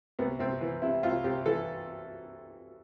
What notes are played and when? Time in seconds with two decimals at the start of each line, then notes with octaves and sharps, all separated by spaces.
0.19 C2 B3
0.39 C2 C4
0.61 E3
0.82 C3 E4
1.03 C2 F4
1.24 C2 G4
1.46 E3 A4